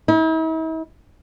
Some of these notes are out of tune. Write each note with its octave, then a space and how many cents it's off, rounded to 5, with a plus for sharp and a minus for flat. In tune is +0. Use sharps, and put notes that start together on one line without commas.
E4 -45